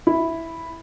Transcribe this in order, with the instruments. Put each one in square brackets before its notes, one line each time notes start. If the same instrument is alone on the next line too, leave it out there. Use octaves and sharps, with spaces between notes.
[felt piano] E4